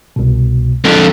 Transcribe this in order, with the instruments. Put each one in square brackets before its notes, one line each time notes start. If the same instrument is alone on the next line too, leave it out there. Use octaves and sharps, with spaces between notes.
[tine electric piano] C2 B2
[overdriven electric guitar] F2 D3 [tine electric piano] F3